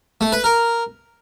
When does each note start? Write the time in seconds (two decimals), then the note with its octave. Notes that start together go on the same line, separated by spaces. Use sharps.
0.21 A3
0.32 B4
0.44 A#4